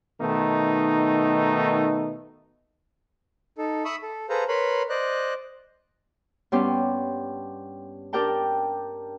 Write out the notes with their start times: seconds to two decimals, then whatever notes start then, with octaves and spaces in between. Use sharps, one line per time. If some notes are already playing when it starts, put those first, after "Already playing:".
0.21 B2 D#3 A3 D#4
3.58 D#4 A4
3.85 E5 B5 C#6 D#6 E6
4.02 A4
4.29 G#4 A4 B4 C5 F5 A#5
4.48 A#4 B4 C#5 B5 C6
4.89 C5 D5 D#5 F#6
6.52 G2 B3 C#4 G4 C6
8.13 D4 G4 A#4 D5 G5 A5